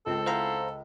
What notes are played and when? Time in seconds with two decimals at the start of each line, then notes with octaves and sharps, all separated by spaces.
0.06 C#2 C4 A4
0.26 B3 C4 E4 C5 F5 A#5